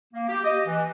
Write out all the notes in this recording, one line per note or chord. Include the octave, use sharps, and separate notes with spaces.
A#3
G4
D#5
E3